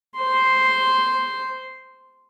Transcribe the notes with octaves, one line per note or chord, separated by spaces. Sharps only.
C5 C6